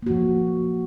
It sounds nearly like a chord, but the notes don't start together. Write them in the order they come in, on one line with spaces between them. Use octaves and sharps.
A#3 F#4 F3